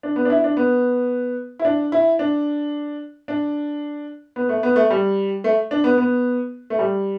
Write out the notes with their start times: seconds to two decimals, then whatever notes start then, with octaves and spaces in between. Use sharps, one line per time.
0.03 D4
0.16 B3
0.25 D4
0.30 E4
0.44 D4
0.57 B3
1.59 E4
1.65 D4
1.92 E4
2.19 D4
3.28 D4
4.36 B3
4.49 A3
4.63 B3
4.76 A3
4.90 G3
5.44 A3
5.71 D4
5.84 B3
5.98 B3
6.70 A3
6.79 G3